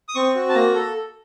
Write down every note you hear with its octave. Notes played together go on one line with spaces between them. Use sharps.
D#6
C4 C#6
F#4
A5
A#3 A#5
A4